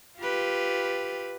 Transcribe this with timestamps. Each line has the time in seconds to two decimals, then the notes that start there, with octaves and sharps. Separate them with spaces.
0.19 F4 G4 B4